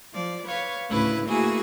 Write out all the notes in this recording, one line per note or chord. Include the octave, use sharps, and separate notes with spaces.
F3 D5
B4 C#5 F5 C#6
D2 A2 C#3 E4 B4 F#6
A3 A#3 E4 F#4 G#4 G#5